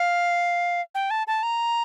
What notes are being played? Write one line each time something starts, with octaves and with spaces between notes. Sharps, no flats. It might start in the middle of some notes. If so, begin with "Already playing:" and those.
Already playing: F5
G5
A5
A5
A#5